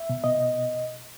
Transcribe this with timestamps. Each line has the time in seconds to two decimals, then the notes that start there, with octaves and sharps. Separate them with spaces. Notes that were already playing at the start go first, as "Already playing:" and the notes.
Already playing: E5
0.09 B2
0.24 B2 D#5
0.38 B2